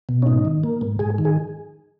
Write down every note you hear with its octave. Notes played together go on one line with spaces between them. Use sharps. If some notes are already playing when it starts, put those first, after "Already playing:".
B2
C#4
G#2 D#4
D#3
A#3
G#2
G#2 G#4
D#3
G#4